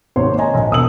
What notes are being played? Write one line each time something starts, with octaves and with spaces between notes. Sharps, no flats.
G#1 C3 A#3 C5 C#5 C6
C5 C#5 D#5 G#5 A#5
A#1
E1 D#6 E6 F#7